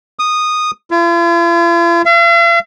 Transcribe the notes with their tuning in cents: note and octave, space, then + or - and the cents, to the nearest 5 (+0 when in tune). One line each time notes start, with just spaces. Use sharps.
D#6 -10
F4 -45
F5 -45